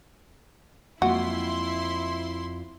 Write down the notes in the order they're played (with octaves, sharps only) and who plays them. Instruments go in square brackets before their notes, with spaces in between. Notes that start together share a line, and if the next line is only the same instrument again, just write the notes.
[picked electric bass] F2 [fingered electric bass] F#3 G#3 A#3 [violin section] E4 C6 [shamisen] F#4